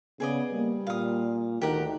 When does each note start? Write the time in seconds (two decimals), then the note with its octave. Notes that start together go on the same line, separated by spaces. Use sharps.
0.20 C#3 B3 G#4 D5 D#5
0.53 G3 A#3
0.87 A#2 F5 D#6
1.61 D2 D#3 G4 A#4 F#5